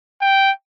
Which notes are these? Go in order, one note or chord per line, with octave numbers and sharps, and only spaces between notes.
G5